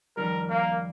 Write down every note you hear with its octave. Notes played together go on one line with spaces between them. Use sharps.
F2 D#3 G3 A#4
A#3